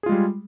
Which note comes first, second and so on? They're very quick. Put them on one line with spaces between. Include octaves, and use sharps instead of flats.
G#4 F4 G#3 G3